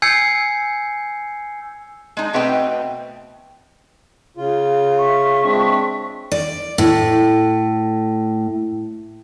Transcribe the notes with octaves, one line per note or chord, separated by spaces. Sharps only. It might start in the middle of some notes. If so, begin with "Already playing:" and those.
G#5 E6 G6 G#6 C7 C#7
G#3 D#4
B2 A3 C4 B4 D#5 G5
C#3 F4
E5 C#6
G#3 C4 D4
D5
A2